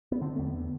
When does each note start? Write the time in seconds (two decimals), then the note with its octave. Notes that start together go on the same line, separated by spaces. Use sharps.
0.12 B3
0.21 D3 C4
0.36 E2 A3
0.46 B3
0.55 D3